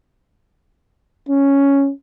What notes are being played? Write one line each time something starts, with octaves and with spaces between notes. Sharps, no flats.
C#4